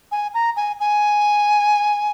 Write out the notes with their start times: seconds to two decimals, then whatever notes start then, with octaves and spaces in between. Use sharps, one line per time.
0.12 G#5
0.34 A#5
0.56 G#5
0.80 G#5